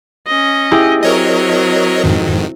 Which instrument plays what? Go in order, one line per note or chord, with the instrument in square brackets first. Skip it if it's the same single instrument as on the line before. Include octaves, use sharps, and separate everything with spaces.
[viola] C#4 D#5
[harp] E4 G4 G#4
[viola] F#3 C4 [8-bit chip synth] A#4 C#5 D#5
[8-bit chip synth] F2 G#2 D#3